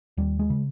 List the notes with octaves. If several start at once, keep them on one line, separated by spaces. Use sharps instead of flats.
D#2 G3
G#3
C#3